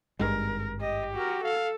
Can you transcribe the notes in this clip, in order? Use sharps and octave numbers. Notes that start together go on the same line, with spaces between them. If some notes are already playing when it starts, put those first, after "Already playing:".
G#1 G2 G#3 A#4
G4 D#5
F#4 A#4
A4 F5